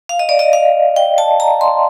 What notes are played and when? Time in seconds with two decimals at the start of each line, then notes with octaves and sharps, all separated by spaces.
0.09 F5
0.19 D#5
0.29 D5
0.39 D#5
0.53 F5
0.96 G5
1.18 A5
1.40 A#5
1.61 C6